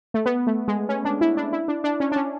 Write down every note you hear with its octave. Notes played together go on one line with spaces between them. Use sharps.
A3
B3
A3
G#3
C#4
D4
E4
D4
E4
D4
D4
C#4
D4
C#4